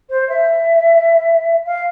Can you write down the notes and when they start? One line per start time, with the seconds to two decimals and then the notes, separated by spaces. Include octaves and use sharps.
0.10 C5
0.29 E5
1.66 F5